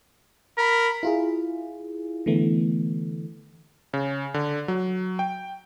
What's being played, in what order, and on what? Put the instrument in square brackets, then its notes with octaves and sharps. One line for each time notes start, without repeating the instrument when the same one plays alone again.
[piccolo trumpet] A#4 [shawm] B5
[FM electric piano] E4 F4 G#4
D3 E3 A3 B3
[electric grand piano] C#3
D3
F#3
G5